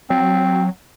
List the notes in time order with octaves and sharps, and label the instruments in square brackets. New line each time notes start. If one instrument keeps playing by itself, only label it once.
[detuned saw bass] F#3 [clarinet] C4